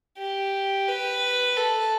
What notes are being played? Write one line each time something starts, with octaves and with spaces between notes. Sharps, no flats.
G4
B4
A4